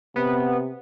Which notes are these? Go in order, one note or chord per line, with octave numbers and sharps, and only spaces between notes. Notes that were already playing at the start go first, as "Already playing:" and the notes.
C3 B3